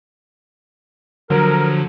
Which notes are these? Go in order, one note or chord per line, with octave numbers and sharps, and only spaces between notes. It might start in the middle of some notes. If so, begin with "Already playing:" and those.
D3 F3 F#3 A#4